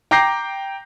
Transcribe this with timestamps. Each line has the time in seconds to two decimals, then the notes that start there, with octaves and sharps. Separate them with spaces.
0.11 G5 A#5 D6 G6 A#6 C7